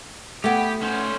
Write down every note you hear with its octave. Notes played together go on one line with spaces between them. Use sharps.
A2 A3 B3 G4
C#4 C5